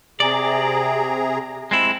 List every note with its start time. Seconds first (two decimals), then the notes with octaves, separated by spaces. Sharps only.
0.20 C3 G#4 D5 A#5
1.71 G#3 C4 E4